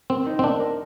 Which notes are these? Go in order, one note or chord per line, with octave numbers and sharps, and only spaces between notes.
C4 A#4
D#4
C4
D4 A#4
A#4